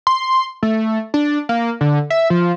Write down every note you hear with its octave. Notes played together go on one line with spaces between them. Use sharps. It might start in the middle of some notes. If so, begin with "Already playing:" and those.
C6
A3
D4
A#3
D3
E5
F3